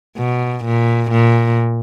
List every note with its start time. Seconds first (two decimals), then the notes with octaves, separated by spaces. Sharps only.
0.18 B2
0.65 A#2
1.11 A#2